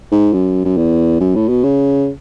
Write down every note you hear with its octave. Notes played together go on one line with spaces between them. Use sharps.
G#2
F#2
F#2
E2
F#2
A2
B2
C#3